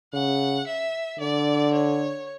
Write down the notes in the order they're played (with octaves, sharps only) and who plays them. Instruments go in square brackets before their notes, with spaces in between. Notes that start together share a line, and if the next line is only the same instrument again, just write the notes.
[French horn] C#3 [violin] F#5
[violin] E5
[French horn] D3 [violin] D5
[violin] C#5